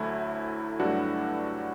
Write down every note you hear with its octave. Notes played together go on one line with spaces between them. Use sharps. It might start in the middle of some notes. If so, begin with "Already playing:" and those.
Already playing: D2 D3 F#3 A3 E4
G2 F#3 A3 D4 F#4